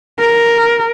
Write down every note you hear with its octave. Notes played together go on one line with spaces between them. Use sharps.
A#4